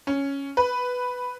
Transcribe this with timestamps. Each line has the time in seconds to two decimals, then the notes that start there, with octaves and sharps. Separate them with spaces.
0.07 C#4
0.57 B4